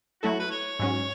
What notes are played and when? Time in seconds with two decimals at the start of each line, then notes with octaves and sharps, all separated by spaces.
0.22 F#3 A3 E4 F#4 A4
0.40 B4
0.51 C#5
0.79 G#2 F#3 C#4